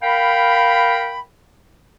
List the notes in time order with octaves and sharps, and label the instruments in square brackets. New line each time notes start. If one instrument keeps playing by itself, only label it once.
[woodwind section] A#4 F5 G5 B5